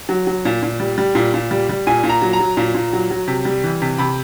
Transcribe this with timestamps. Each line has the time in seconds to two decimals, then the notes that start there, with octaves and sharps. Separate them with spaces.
0.09 F#3
0.27 F#3
0.45 A#2
0.63 A#2
0.80 G3
0.98 G3
1.15 A#2
1.34 A#2
1.51 G3
1.69 G3
1.87 A#2 G#5
2.04 A#2
2.09 A#5
2.22 F#3
2.33 A#5
2.40 F#3
2.57 A#2
2.75 A#2
2.93 F#3
3.11 F#3
3.28 C3
3.45 G3
3.64 E3
3.82 C3
3.98 C3 B5